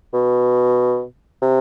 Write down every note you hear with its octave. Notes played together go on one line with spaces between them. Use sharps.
B2
C3